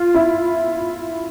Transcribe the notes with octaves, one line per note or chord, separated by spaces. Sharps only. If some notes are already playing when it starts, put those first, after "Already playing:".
Already playing: F4
E4